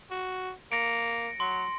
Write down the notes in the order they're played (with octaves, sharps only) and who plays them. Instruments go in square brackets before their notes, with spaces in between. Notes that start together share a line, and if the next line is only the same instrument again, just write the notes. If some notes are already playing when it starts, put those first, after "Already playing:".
[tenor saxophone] F#4
[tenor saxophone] A#3 [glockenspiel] A#6 C#7 D7
[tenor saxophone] F#3 [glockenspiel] C6